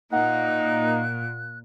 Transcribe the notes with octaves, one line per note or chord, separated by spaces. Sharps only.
A#2 A#3 D#4 F#5 F#6